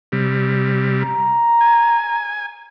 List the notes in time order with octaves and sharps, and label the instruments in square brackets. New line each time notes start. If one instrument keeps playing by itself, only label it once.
[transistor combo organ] C3 G3
[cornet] A#5
[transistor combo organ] G#5